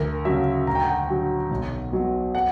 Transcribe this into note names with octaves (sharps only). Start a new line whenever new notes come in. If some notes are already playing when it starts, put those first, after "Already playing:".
Already playing: D2 A#4
C#3 F#3 E5
D2 A#5
G5
F#5
G5
D3 F#3
B1
B2 F#3
F#5